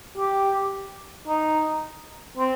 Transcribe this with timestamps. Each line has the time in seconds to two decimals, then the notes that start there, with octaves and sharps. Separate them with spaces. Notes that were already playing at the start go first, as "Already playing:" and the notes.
0.18 G4
1.28 D#4
2.38 C4